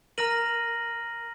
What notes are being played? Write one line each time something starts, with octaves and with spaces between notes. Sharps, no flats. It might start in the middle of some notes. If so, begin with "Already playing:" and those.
A#4 A#5 F6 A#6 D#7 F#7